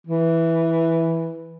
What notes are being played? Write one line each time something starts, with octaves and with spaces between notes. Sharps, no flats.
E3